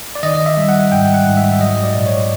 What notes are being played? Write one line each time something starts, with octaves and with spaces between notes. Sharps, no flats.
D5
D#3 D#5
E5
G3
F#5
G#2 G5
F#5
G#2
E5
F#3 D#5
D5
A#2
C#5